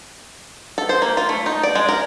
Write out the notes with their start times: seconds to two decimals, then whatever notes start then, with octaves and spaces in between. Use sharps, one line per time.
0.78 A4
0.89 C5
1.02 A#3
1.17 F4
1.29 A3
1.46 D#4
1.63 D5
1.75 G#3
1.89 A#4